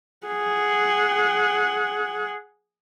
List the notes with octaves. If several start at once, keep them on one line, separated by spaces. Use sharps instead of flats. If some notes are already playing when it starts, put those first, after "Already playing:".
G#4 F#5